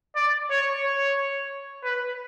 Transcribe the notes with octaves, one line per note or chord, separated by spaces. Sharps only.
D5
C#5
C#5
B4